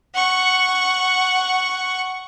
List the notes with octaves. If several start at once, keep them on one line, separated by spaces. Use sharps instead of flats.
F#5 C#6